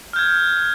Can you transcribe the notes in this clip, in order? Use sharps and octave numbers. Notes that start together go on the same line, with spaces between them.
F6 G6 G#6